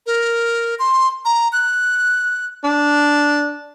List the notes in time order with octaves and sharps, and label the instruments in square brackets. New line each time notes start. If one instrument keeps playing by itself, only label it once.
[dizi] A#4
C6
A#5
F#6
[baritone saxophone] D4